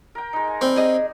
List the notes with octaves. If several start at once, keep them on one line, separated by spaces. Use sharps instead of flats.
A#4 G5
G#3 D#4
G#5
G3 C4
G#4 D#5